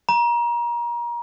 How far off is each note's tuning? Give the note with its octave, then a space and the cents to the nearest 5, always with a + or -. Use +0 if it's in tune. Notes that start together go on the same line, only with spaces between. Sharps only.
A#5 +30